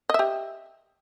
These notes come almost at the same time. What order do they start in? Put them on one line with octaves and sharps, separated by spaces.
D#5 E5 G4